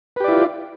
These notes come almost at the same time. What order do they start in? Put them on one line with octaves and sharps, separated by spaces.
B4 G4 D5 E4 F4